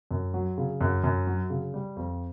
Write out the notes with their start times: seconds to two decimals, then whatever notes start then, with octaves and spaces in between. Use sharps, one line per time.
0.11 F#2
0.34 F#3
0.58 C#3
0.81 F#2
1.04 F#2
1.27 F#3
1.50 C#3
1.74 G3
1.96 F2